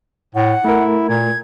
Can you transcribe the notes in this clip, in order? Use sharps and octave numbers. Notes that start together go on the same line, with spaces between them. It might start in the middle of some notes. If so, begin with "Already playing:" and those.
A2 F#5
A3 E4 A#4
A#2 G#6